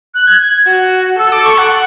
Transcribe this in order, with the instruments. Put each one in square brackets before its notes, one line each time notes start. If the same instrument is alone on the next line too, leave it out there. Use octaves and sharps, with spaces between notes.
[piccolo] F#6
G#6
G#6
G#6
[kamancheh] F#4
[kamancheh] A4 [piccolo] E6
[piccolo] D6
C#6
F#5
F#5